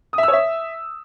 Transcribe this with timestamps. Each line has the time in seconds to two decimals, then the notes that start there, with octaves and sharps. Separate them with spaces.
0.13 D#6
0.18 E5
0.23 E6
0.28 C#5
0.33 E5